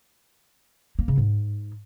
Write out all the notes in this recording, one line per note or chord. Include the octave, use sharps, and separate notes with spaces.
A#3
C#3
G#2